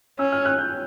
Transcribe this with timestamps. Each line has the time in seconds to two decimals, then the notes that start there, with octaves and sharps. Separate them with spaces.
0.19 C#4 E6
0.32 F6
0.45 F#6
0.58 G6